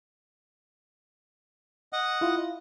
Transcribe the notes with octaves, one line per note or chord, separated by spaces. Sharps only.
D#5 F#5
E4 F4